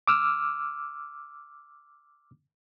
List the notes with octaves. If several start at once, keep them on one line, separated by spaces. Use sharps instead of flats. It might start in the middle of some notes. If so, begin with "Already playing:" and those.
D6 E6 F6